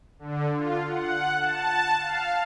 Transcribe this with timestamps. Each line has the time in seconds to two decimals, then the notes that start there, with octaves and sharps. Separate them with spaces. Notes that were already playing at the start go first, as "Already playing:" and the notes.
0.19 D3
0.57 F4
0.87 F#5
1.39 A5
1.99 F5